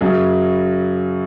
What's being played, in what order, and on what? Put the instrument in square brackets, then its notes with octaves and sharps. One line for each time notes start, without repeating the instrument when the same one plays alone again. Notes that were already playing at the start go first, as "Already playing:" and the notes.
[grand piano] F#2 C#3 F#3